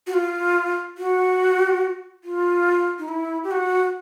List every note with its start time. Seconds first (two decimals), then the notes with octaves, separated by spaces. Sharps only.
0.07 F#4
0.14 F4
0.98 F#4
2.24 F4
2.99 D#4
3.08 E4
3.44 G4
3.51 F#4